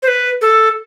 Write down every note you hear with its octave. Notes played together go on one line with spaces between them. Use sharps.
C5
B4
A4